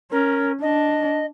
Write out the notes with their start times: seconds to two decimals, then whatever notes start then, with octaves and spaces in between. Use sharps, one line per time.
0.11 C#4 A#4
0.62 D4 D#5